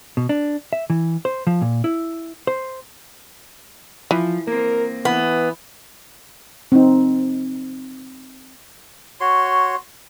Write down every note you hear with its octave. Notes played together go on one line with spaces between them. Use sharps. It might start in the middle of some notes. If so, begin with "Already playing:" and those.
B2
D4
E5
E3
C5
F3
A#2
E4
C5
E3 F3
A#3 C4 A#4
E3 B3
C4 D#4
F#4 C#5 C6